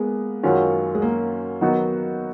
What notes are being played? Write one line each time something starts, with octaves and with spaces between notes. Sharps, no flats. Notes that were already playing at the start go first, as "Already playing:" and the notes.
Already playing: G#3 A#3 B3
F#2 D#3 F#3 C#4 F4
G#3
A#3
D#3 F#3 B3 D#4 F#4